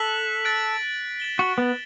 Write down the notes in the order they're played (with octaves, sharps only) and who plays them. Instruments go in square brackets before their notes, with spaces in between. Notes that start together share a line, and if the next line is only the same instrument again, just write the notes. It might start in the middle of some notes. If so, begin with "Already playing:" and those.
Already playing: [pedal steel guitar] A4 [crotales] F#6 B6 F#7
[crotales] F#6 A6 D7
A6 E7 G7
[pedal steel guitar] F#4
B3